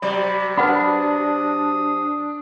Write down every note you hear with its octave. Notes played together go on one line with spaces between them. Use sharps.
C3 F#3 D5 B5
D4 B4 F#5 B5 D#6